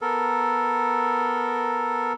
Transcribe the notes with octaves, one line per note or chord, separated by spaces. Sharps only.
B3 A4 A#4